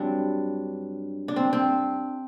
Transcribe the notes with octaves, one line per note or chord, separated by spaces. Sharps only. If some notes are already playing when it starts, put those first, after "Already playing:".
Already playing: G2 F#3 C4 D4
D4
C4
C4